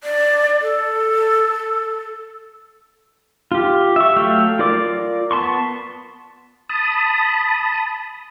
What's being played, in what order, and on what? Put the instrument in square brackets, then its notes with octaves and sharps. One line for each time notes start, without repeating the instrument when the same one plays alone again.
[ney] D5
A4
[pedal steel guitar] F4 G4
E5 C#6
F#3 A3 F5 G5 E6
F4 A#4 D5 D6
B3 A5 C6 C#6
[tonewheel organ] A5 B5 D#6